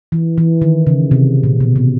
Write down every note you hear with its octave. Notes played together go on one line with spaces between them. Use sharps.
E3
E3
D#3
C#3
C3
A#2
B2
C3